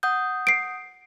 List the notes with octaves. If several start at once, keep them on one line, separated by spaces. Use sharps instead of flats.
F#5 D#6 G6
C7 D7